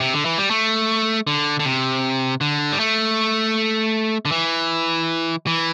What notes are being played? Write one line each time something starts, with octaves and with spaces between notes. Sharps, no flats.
C3
D3
E3
G3
A3
D3
D3
C3
D3
G3
A3
D3
E3
E3